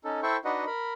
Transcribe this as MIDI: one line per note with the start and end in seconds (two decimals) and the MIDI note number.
0.04 0.20 61
0.04 0.20 63
0.04 0.20 69
0.23 0.37 64
0.23 0.37 69
0.23 0.37 72
0.23 0.37 76
0.23 0.37 79
0.23 0.37 85
0.45 0.65 62
0.45 0.65 63
0.45 0.65 66
0.45 0.65 71
0.45 0.65 75
0.45 0.65 78
0.67 0.93 70
0.67 0.93 83